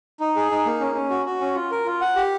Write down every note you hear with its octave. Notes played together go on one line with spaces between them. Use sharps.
D#4
G#4
D#4
A#3
C#4
C#4
F#4
F#4
C#4
F4
A#4
F4
F#5
G4